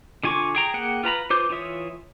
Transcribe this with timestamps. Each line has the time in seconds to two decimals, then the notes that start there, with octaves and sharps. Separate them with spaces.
0.24 D3 F4 G#5 C#6 D6
0.55 G#4 G5 A#5
0.74 A#3 G#4 F#5 G5
1.03 F4 B4 A#5 B5
1.30 F4 B4 C5 D6 G6
1.49 E3 F4 C#5 E5 D#6